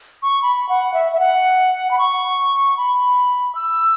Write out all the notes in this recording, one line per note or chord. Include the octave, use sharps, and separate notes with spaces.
C#6
B5
F#5
E5
E5
F#5
B5
C#6
B5
E6